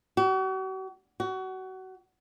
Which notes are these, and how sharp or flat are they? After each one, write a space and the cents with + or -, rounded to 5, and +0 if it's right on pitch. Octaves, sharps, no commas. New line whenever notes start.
F#4 +40
F#4 +25